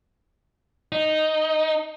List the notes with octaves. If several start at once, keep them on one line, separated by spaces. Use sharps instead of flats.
D#4